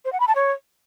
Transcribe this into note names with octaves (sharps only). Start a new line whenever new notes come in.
C5
F#5
B5
A5
C#5